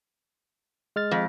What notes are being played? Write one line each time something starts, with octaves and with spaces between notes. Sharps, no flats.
G#3 F6 A6
F2